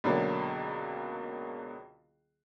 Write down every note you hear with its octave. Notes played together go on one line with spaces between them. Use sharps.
C#2 B2 D3 F#3 A#3